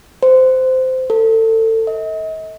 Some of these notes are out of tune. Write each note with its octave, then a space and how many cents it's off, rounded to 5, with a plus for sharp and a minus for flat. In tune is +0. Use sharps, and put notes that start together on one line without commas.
C5 -15
A4 +25
D#5 +40